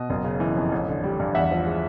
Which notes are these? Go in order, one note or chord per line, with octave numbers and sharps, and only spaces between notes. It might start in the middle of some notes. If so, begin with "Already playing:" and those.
Already playing: B2 D#5
F#1
C#3
E3
F2
A1
D3
G3
G2
E2 E5 F#5
F3
G#3